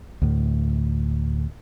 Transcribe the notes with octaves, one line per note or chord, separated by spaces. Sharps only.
D2 A2